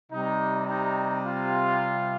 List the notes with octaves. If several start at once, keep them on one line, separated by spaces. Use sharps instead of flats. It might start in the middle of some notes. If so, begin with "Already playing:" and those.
C3 G3 D#4
D#4
F4